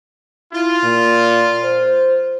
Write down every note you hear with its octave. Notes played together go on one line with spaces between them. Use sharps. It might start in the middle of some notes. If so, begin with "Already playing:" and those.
E4 F4
A#2
C5